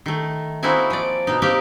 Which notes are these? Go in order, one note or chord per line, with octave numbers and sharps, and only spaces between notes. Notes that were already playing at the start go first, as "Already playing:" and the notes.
D#3 A3
A#3 C4 D#4 E4 F#4 G#5
F3 D5
B2 D#4
A#3 C4 D#4 G4 A#4